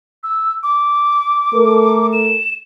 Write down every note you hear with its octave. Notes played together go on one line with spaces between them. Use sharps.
E6
D6
A3 A4 A#4
E7